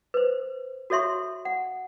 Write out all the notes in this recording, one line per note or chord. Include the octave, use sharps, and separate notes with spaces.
B4 C5
F#4 A4 C#5 E5 C6 C#6
F#5